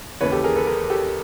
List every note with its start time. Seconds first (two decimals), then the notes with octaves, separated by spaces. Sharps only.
0.21 D#2 C#3 E3 B4 C#5
0.32 G4 A4
0.44 G#4 A#4
0.56 A4 B4
0.67 G#4 A#4
0.90 G4 A4